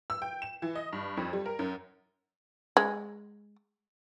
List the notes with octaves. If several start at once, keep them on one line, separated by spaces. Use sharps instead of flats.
E6
G5
E7
E3
D#5
G2
F2
G3
A#4
F#2
G#3